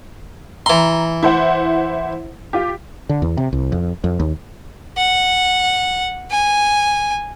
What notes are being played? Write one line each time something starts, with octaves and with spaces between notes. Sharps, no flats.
E3 A#5 C6
E4 C5 F#5
F4 G4
D3
E2
C3
C2
F2
F2
D#2
F#5
G#5